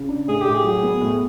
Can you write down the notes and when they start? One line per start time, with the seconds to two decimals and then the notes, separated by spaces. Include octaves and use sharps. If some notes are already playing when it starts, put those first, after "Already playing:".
Already playing: C#3
0.09 D4
0.28 A2 G#4
0.41 A2 G4
0.54 G#4
0.64 F#3
0.83 B3
1.01 A2